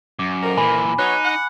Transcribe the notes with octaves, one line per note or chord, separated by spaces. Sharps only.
F#2 D6
F2 D#3 A#4
A#2 E3 G#5 B5
F#3 B3 D#4 C#5 F#6
F#5